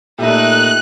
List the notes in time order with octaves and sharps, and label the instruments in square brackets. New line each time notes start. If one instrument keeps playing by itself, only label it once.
[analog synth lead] A#2 [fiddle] A3 D#4 [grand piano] G4 A4 E5 [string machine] F#6